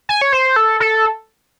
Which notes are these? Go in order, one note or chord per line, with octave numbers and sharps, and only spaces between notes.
G#5
C#5
C5
A4
A4